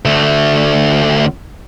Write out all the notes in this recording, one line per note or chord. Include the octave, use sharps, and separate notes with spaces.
D2 A3